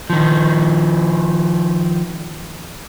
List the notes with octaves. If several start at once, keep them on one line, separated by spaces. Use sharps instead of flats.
D#3 F3